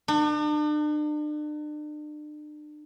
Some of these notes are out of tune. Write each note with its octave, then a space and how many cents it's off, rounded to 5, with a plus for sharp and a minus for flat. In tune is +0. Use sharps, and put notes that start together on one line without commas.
D4 +40